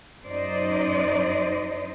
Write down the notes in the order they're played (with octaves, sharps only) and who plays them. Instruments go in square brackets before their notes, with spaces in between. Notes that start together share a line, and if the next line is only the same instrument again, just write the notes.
[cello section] F#2 D#4 C5 D5 D#5